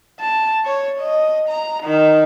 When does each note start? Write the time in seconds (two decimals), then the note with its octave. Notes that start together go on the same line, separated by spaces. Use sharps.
0.20 A5
0.66 C#5
1.00 D#5
1.49 A#5
1.84 D#3